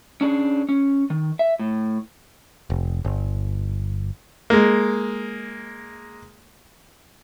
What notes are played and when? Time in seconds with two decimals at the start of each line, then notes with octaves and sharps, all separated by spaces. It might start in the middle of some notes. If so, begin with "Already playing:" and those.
0.21 C#4 D4 G#4
0.69 C#4
1.10 D#3
1.39 E5
1.59 A2
2.70 F1
3.05 G1
4.50 G#3 A#3